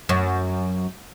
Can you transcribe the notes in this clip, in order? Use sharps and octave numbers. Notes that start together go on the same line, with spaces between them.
F#2